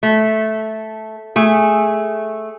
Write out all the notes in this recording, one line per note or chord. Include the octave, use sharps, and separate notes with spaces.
A3
A3 G#4